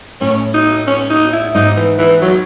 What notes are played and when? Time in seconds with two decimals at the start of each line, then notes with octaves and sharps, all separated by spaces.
0.21 A2 C#4
0.54 D#4
0.87 C#4
1.10 D#4
1.33 E4
1.55 G#2 D#4
1.76 E3
1.99 E3
2.22 F#3